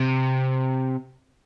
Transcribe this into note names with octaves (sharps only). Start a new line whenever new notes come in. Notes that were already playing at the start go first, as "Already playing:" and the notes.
Already playing: C3